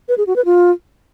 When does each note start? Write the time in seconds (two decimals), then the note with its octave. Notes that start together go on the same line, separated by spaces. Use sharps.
0.09 B4
0.18 G#4
0.27 F#4
0.36 B4
0.45 F4